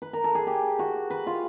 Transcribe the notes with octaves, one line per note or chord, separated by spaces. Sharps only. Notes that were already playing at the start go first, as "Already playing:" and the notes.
B4
A#4
A4
G#4
G4
F#4
B4
F4